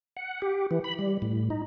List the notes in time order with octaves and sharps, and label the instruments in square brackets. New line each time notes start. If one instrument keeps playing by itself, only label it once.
[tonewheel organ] F#5
G4
E3
B5
G3
A2
D#4